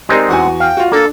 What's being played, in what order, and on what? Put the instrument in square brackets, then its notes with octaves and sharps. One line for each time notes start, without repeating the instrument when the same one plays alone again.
[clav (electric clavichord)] G#3 C4 D#4 [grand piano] G4 A#4 D5
[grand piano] E2 F#4 G#5 [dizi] F#5
[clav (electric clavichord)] F5 [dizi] G5
[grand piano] F4 F#4
[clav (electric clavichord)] A#3 [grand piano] D4 [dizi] A4